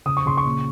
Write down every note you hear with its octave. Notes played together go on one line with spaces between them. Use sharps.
C#3 D#6
C#6
C#3 C6
C#6
A#2